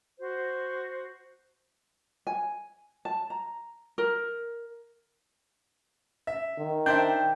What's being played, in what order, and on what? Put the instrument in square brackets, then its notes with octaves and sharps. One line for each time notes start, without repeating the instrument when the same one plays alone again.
[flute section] F#4 C5
[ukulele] G#5
A5
A#5
A#4
[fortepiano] E5
[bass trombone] D#3
[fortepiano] D4 C5 E5 [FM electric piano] G5